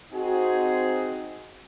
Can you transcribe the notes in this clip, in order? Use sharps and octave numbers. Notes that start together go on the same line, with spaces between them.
C4 D#4 F#4 G#4